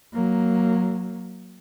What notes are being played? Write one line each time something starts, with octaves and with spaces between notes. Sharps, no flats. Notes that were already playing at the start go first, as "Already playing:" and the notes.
F#3 A#3